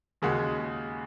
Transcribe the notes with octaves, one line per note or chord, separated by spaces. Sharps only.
D#2 C#3 G#3 F#4